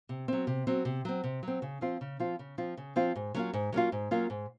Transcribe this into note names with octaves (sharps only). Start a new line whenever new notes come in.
C3
F#3 C4
C3
F#3 C4
C3
F#3 C4
C3
F#3 C4
C#3
F3 C4 F4
C#3
F3 C4 F4
C#3
F3 C4 F4
C#3
F3 C4 F4
G#2
F#3 A#3 C#4 F4
G#2
F#3 A#3 C#4 F4
G#2
F#3 A#3 C#4 F4
G#2